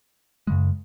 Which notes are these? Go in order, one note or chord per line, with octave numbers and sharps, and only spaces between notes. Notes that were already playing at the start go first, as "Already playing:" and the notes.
F#2 C#3 G#3